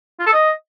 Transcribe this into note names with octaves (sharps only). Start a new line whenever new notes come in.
F4
A4
D#5